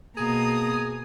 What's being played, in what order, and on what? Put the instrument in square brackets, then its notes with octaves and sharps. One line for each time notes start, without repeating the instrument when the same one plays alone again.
[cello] B2 A#3 [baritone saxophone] G#4 [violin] A#5 D#6